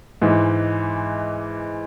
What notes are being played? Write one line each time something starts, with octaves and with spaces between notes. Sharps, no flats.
G#2 E3 G#3